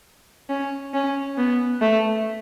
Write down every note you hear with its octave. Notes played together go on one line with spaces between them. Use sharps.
C#4
C#4
B3
A3